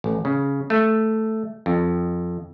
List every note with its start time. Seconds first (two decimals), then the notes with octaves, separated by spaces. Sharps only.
0.04 A1
0.25 C#3
0.70 A3
1.66 F2